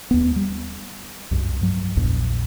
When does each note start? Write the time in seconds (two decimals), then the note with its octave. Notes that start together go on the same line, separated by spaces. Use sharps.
0.11 D#2 B3
0.36 G3
1.31 C2 F#2
1.61 G2 F#3
1.96 A#1 E2 A#2